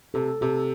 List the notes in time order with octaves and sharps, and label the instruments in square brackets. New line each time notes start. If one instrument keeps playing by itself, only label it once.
[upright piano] C3 [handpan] A4
[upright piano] C3 [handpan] A4